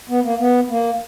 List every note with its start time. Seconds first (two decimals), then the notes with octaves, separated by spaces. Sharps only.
0.09 B3
0.24 A#3
0.39 B3
0.69 A#3